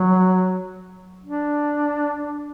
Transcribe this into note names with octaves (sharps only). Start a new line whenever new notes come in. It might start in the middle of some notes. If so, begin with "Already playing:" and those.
Already playing: F#3
D4